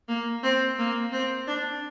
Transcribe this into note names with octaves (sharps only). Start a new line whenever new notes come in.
A#3
C4
A#3
C4
D4